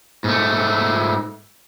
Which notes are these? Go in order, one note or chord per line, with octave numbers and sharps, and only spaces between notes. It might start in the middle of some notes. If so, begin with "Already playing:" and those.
G#2 A3